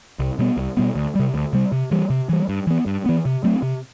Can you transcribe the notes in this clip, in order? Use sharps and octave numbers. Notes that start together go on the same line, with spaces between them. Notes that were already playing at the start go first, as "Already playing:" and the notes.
C2
B2 G3 B3
C2
B2 G3 B3
D2
C3 G3
D2
C3 G3
C3
E3 G3
C3
E3 G3
G2
E3 B3
G2
E3 B3
C3
F#3 A3 C4
C3